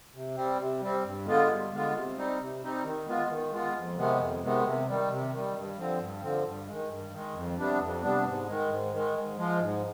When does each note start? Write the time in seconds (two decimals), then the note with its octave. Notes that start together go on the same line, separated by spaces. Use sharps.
0.13 C3
0.36 G3 C4
0.59 C3
0.81 G3 C4
1.04 G2
1.25 D3 G#3 B3 F4
1.48 G2
1.71 D3 G#3 B3 F4
1.94 C3
2.16 G3 C4 D#4
2.39 C3
2.61 G3 C4 D#4
2.84 D#3
3.06 G#3 B3 F4
3.29 D#3
3.51 G#3 B3 F4
3.74 F2
3.96 C3 D#3 G#3 B3
4.19 F2
4.42 C3 D#3 G#3 B3
4.64 C3
4.87 D#3 G3
5.09 C3
5.31 D#3 G3
5.54 G2
5.76 D3 F3 C4
5.99 G2
6.21 D3 F3 C4
6.45 G2
6.66 D#3 G#3
6.89 G2
7.12 D#3 G#3
7.34 F2
7.57 C3 G3 B3 D4
7.80 F2
8.02 C3 G3 B3 D4
8.25 G#2
8.47 D#3 G#3
8.69 G#2
8.92 D#3 G#3
9.14 G#2
9.37 F3 G#3
9.60 G#2